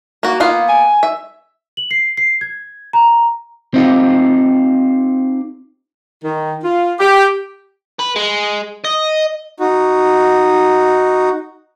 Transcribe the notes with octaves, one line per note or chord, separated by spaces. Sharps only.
A#3 F#4
A#3 B3 F4 F5
G#5
E5
F#7
C7
C7
G#6
A#5
C4 D#4 F4 G4
D#3
F4
G4
B4
G#3
D#5
D#4 F#4